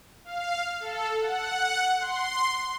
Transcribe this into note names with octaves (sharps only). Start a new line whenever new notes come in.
F5
A4
F#5
C6